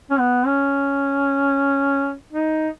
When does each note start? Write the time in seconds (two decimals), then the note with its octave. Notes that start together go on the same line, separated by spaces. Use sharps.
0.11 C#4
0.19 B3
0.46 C#4
2.33 D#4